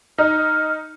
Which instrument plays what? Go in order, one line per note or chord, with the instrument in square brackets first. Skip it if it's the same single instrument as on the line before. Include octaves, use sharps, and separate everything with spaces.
[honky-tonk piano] D#4 [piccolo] F6